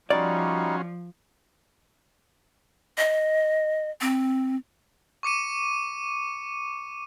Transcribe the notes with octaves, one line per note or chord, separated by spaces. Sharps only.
F3 G3 C#4 D#4 F4 F#4 D5
D#5
C4
C#6 D6 C#7 D#7